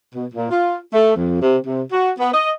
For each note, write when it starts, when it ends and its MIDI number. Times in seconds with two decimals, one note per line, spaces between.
0.15 0.27 47
0.34 0.50 46
0.50 0.78 65
0.93 1.13 57
1.15 1.39 41
1.42 1.57 48
1.65 1.83 48
1.92 2.12 66
2.19 2.32 59
2.33 2.51 75